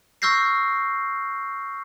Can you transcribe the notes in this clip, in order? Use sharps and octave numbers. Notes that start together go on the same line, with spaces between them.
C#6 E6 F6 G6 A#6 C7